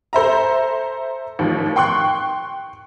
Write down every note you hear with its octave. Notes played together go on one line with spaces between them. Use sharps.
A4 C5 E5 A#5
A1 D#2 F3
G5 C6 C#6 F#6